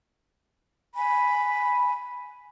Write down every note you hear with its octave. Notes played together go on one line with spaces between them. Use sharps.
G#5 B5